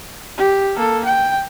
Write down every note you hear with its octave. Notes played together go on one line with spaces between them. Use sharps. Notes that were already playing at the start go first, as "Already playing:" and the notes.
G4
A#3 A4
G5